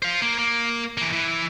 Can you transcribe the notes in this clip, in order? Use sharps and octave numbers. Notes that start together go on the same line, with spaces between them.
C5 F5
A#3
A#3
E3 A#3
E3